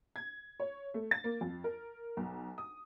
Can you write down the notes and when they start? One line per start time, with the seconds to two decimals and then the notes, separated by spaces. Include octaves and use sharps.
0.16 G#6
0.60 C#5
0.94 A3
1.11 A6
1.24 A#3
1.41 F2
1.64 A#4
2.17 B1
2.58 D#6